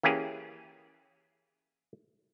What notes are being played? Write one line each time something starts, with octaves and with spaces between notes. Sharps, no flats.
E3 A#3 C#4 G4 G#4